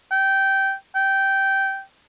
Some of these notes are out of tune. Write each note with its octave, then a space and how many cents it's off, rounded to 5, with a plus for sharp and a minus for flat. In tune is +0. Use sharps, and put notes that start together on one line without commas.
G5 -15
G5 -15